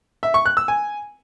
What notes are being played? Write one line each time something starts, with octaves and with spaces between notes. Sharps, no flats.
E5
C#6
F#6
E6
G#5